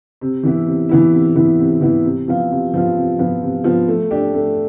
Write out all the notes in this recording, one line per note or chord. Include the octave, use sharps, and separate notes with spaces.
C3
E3 B3 E4
C3
E3 B3 E4
C3
E3 B3 E4
C3
E3 B3 E4
C3
F3 B3 F4
C3
F3 B3 F4
C3
F3 B3 F4
C3
F3 B3 F4
A3
D4 G4
A3